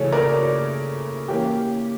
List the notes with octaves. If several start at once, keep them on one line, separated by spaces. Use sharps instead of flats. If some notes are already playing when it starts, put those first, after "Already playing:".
Already playing: C#3 E3 A3 C#4 A4 C#5
A#4 D5
E3 A#3 C#4 G4